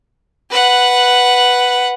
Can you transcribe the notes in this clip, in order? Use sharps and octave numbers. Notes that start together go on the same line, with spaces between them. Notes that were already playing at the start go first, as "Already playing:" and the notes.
B4 F#5